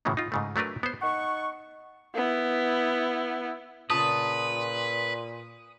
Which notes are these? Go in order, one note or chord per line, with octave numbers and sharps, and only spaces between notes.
A2 C#3 E3 F#3 A#3 B3
D#4 F4
G#2 C#3 A3
F#3 A3 D4 A#4 B4
B3 C5
D#4 F#5 C#6
B3 E4
A#2 C#3 F4 B4 A5 D#6